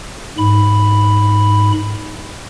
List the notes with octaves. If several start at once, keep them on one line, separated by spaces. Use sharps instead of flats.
G#2 B5